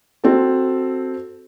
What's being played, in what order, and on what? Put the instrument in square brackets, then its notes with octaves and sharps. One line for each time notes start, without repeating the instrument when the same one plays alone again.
[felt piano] C4 F#4 A4